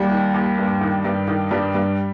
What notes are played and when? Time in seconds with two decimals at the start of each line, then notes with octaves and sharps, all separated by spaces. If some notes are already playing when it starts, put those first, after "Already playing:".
Already playing: D#2 G3
0.11 D#3
0.34 D#2
0.58 G2
0.81 D#3
1.04 G2
1.28 D#3
1.51 G2 G3
1.74 G2